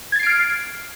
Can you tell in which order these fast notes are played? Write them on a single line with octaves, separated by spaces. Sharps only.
G#6 A6 C7 D7 F6